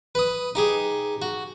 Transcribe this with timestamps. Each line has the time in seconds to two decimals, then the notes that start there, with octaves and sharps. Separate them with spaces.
0.15 B4 D#6
0.55 D#4 G4 G#4
1.22 F#4